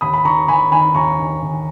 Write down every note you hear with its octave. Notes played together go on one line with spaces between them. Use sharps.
D#2 B5 D#6
B5
D#3 A#5 C#6
D#2 G#5 B5
D#3 G#5 B5
D#2 A#5 C#6
D#3
D#2